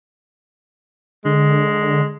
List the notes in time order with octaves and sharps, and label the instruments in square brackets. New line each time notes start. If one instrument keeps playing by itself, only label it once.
[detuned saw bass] D3 [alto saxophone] G#3